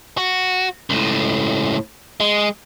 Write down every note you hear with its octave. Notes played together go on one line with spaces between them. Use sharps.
F#4
C#2 A2
G#3